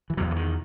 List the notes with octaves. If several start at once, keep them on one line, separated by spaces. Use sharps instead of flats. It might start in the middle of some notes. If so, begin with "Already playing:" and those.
E3
E2 B2 F#3
E3
D#3